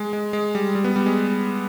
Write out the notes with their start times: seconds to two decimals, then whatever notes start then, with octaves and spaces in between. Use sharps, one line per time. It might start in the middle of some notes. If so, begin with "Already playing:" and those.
Already playing: G#3
0.13 G#3
0.33 G#3
0.55 G3
0.75 G3
0.84 B3
0.96 G3
1.06 G#3